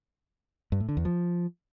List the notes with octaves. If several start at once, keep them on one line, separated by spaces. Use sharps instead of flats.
G2
A2
D3
E2
F3